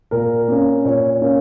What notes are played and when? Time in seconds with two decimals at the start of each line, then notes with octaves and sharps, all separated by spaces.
0.11 A#2 A#4
0.48 A#3 C#4
0.85 A#2 C#5
1.22 A#3 C#4